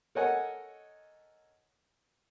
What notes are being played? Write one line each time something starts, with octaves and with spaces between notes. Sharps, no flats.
A4 A#4 C#5 D#5 F#5 G#5